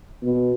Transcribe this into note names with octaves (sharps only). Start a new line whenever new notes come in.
B2